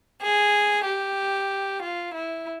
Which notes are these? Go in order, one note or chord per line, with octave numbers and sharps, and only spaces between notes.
G#4
G4
F4
E4